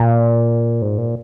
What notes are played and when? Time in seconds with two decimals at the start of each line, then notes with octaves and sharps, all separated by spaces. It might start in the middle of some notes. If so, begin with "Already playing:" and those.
Already playing: A#2
0.82 G#2
0.98 A#2